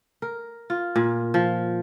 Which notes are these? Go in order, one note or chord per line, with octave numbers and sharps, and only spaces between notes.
A#4
F4
A#2
F3